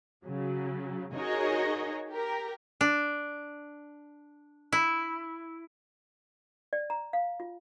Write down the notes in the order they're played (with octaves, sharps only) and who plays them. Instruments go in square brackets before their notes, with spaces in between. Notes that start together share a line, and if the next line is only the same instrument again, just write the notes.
[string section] C#3 F#3
D#4 F#4 G#4 A#4 C#5 D#5
G4 A#4
[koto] D4
E4
[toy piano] D5
A#5
F5
F4